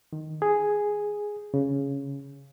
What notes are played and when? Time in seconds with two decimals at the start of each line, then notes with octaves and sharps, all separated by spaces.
0.13 D#3
0.42 G#4
1.54 C#3